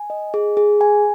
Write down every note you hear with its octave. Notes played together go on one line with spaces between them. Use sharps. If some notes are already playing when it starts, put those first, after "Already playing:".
Already playing: G#5
D#5
G#4
G#4
G#5